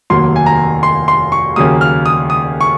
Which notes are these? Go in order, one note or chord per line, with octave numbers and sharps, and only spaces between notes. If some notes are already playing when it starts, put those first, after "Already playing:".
F1 D#2 D#3 F#3 A#3 C6
G#5
A#5
C6
C6
C#6
D#2 C#3 F#3 A#3 D#6
F6
D#6
D#6
C#6